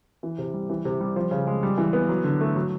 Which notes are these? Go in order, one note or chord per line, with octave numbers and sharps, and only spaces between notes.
E3
C3
G3
E3
C3
G3
F3
C#3
G#3
G3
E3
B3
F#3
D3
A3
F#3